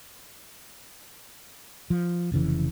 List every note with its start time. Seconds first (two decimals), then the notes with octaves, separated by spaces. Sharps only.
1.90 F3
2.32 F1 C#3 E3